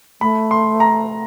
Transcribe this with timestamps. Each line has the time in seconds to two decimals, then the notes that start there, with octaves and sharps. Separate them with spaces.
0.21 A3 B5
0.51 C6
0.80 A#5